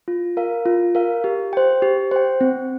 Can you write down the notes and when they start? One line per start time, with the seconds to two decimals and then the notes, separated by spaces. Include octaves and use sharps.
0.08 F4
0.37 A#4 F5
0.66 F4
0.95 A#4 F5
1.24 G4
1.53 C5 G5
1.82 G4
2.11 C5 G5
2.41 C4